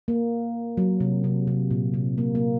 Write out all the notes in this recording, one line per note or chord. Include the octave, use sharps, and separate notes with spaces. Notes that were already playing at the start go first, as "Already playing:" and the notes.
A#3
F#3
C3
C3
C3
A#2
C3
A#3
A#3